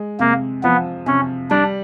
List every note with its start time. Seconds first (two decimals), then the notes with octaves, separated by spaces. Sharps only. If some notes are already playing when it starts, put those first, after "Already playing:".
Already playing: G#3
0.19 C3 A#3
0.64 F3 B3
1.06 C3 C#4
1.50 G3 D4